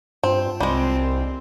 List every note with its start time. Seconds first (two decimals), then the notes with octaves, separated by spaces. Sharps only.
0.23 G2 C4 F4 A5
0.60 C2 G3 G#3 C4